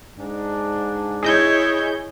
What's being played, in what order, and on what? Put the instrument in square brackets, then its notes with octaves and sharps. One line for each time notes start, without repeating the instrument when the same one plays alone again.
[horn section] G#2 D4
[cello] E4 C#5 [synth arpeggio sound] G#4 D#5 G6